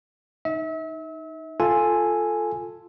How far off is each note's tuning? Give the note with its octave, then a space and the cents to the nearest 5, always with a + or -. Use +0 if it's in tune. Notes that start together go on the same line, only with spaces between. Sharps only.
D#4 +0 E5 -35
F4 +0 A4 +0 G#5 +0